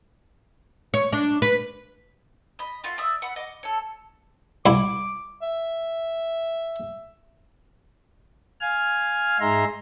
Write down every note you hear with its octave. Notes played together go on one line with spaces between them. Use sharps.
C#5
D4
B4
D#5 B5
A3 F4 F#4
D5 E5 D#6 E6
F#5 B5
D#5 D6
A4 C#5
C2 E4 D6
E5
F5 G#5 F6
G#2 D#4 G#4 E5 A#5 C6